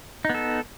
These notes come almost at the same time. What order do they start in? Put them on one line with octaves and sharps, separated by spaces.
D#4 B3 A4